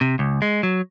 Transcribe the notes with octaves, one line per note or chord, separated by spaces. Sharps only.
C3
C#2
G#3
F#3